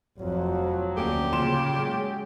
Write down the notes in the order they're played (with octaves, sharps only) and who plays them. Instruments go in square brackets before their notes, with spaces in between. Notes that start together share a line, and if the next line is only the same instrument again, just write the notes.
[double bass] F1 F2 [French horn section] F3 F#3
[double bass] D2 [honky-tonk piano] A3 A#3 C#4 [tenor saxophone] G4
[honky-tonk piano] A#2 C6 E7 [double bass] C#3
[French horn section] F#3 C#4 G#4 [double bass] G#3